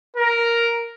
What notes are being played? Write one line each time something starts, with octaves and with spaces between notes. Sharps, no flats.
A#4